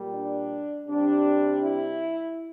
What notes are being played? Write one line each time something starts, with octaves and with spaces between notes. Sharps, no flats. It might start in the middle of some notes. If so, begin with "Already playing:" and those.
Already playing: A#2 G3
D4
C3 G3 D4
E4